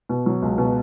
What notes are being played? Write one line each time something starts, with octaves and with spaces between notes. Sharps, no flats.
B2
F#3
C#2
B2